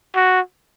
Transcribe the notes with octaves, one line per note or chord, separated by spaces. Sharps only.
F#4